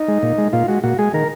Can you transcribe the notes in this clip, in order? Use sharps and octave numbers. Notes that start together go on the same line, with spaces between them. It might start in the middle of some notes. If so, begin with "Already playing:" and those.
Already playing: D#4
G#3
A#2
G#3
A#2 F4
G#3 F#4
A#2 F#4
G#3 G#4
D#3 A#4